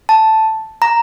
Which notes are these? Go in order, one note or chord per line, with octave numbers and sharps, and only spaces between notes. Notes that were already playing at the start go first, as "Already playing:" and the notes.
A5
A#5